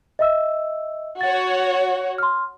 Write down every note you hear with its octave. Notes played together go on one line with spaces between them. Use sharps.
D#5 E5 E6
F#4 C#5 F#5 A6
C6 F6